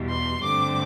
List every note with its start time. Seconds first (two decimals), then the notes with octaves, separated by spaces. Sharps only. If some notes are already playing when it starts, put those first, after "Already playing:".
Already playing: E2 B2 G3
0.09 C6
0.42 G2 D3 A3 C4 D6